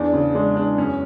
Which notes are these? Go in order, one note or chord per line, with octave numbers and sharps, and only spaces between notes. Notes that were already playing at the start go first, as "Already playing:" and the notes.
Already playing: E2 D4
C#3
G#3 D4
E2 D4
F#2 C#4